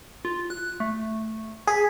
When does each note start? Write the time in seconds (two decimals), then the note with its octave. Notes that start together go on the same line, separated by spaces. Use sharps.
0.25 F4
0.50 F#6
0.80 A3
1.67 G#4 B6